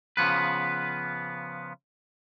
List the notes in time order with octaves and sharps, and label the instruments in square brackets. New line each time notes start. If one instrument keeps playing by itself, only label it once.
[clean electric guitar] C#3 F3 B3 B4